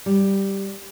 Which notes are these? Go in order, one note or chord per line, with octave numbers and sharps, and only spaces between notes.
G3